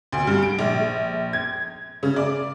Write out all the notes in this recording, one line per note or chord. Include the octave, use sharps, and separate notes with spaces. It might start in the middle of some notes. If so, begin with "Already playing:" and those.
D2
G2
D7
A#1
G#6
C#3
D5